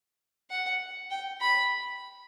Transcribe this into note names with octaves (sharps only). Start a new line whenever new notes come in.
F#5
G5
B5